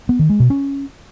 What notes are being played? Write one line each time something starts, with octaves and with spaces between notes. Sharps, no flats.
B3
D#3
G#3
B2
C#4